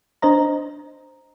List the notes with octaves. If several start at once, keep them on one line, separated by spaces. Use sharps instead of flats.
D4 C5 D#5 A#5